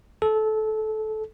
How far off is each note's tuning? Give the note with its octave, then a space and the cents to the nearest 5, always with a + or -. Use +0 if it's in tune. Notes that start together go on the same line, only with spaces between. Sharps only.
A4 -20